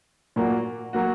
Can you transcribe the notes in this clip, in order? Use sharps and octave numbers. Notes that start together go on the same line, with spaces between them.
A#2 F#3 A#3 F#4
F#3 A#3 F#4